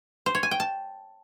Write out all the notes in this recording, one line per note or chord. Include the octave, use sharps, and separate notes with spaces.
C5
C#5
G#5
G5
A5